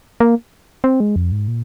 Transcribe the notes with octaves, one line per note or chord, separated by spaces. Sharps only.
A#3
C4
G#3
F2
G#2
A#2